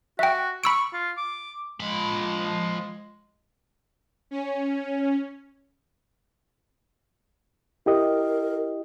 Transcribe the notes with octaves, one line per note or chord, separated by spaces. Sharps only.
F#4 E5 G5
B5 C#6 E6 D7
F4
D6
F3 G#3 B5
C#4
E4 G4 A#4 D#5